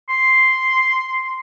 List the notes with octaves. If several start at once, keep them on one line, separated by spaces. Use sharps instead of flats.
C6